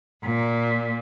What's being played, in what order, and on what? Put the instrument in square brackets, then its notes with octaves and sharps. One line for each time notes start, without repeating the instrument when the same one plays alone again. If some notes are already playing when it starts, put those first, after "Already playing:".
[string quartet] A#2